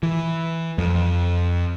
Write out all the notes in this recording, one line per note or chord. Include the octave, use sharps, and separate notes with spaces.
E3
F2